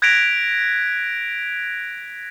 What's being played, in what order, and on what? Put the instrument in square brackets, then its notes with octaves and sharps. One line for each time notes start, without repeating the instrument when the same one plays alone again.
[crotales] F#6 G#6 A#6 B6 D7 F7